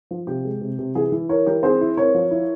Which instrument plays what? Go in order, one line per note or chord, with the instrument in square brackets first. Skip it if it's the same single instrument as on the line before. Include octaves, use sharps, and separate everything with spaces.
[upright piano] F3
C3 G4
G#3
C3
C3
E3 G#4
E3
E4 A#4 C#5
E3 G4 A#4
C4 G#4 C5
E4
C4 A#4 C#5
F3
E4